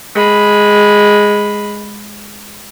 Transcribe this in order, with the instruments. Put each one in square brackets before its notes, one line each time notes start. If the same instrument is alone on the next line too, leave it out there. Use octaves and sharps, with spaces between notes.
[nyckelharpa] G#3 B5